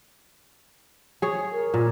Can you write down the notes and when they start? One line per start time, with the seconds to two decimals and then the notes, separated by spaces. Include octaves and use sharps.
1.22 G#4 C#5
1.52 A#4
1.74 A#2